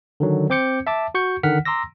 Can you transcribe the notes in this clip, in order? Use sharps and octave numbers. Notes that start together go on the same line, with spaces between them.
D3 D#3 F#3
C4 C5 D6 G6 C#7
E5 A5 D6
F#4 C#6 G6 C#7
D3 D#3 F#5 F6 B6
A#5 C6 D6 E6 A#6